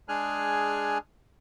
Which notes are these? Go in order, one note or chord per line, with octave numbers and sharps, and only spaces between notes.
G#3 D4 G#4 G#5 F6 F#6